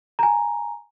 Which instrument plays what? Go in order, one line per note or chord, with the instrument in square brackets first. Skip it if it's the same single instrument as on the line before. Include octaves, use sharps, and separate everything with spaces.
[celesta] G#5 A#5